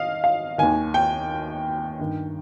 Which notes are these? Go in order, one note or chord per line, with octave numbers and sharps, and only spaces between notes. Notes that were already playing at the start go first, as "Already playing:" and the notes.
Already playing: D#3 D#5 F5
F5
D#2 D#3 G#5
G5
G2 D#3